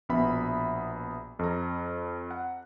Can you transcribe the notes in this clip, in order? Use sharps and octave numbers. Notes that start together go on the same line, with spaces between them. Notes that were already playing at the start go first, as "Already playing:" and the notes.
A#1 B2 B3 E5 B5
F2 A#5
F#5